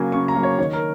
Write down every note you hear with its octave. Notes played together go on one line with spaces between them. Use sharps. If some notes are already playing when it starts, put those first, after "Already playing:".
Already playing: C#3 F#3 A#3 G#5
C#3 C#6
A#5
F#3 A#3
C#5
D#3 C#5
A#4